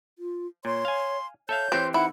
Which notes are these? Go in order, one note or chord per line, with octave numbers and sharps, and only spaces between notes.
F4
A#2 C#5 C6
F5 G#5
A4 C#5 E5 F5 G6
E3 C4 G4 C5
D#4 E4 F#5